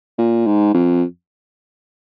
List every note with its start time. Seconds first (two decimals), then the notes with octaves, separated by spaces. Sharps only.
0.18 A#2
0.46 G#2
0.74 F2